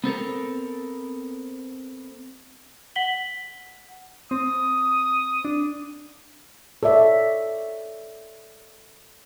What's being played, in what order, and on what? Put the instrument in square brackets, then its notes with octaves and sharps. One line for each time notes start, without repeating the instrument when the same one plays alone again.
[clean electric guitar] B3 C4 A4 A#4
[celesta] F#5 B6 F#7 G7
[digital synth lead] C4 [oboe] D#6
[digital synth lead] D4
[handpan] A4 C#5 D5 E5